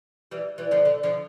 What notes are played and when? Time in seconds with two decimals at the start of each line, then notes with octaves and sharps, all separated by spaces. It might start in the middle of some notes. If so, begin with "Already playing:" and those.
0.31 E3 G3
0.58 E3 G3
0.71 D3 F3
0.85 D3
1.03 D3 F3